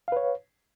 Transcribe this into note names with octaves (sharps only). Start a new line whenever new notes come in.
B4 C#5 F5